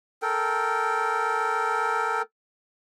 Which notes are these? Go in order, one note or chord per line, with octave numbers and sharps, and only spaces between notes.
A4 A#4 G5